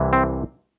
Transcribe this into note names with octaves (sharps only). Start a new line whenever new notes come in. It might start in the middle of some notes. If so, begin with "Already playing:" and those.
Already playing: C2 C3 E3
C4